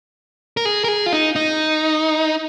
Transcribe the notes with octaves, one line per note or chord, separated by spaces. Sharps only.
A#4
G#4
A#4
G#4
F4
D#4
D#4